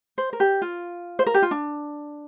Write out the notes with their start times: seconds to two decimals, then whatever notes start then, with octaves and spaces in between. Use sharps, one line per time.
0.18 C5
0.33 A#4
0.40 G4
0.62 F4
1.19 C5
1.26 A#4
1.34 G4
1.42 F4
1.51 D4